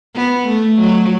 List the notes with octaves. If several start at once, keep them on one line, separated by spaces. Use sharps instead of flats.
B3
A3
F#3